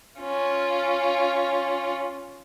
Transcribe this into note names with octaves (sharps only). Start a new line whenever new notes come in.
C#4 F4